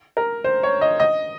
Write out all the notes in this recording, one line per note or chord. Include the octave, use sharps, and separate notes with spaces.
A#4
C5
C#5
D#5
D#5